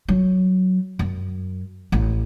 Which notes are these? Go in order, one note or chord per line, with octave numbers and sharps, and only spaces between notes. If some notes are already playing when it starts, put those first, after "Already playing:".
F#3
F#2
A1